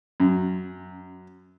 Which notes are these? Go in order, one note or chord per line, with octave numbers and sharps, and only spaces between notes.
F#2